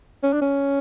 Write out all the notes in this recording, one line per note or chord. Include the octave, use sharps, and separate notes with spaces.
C#4
D4
C#4